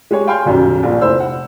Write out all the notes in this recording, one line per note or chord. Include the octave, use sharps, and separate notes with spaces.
G#3 G4 G#4 C#5
F5 G5 G#5 C6 F6 G6
D#1 B1 F#2
A#1 A#2 F3
F1 E4 C5 E6
F#5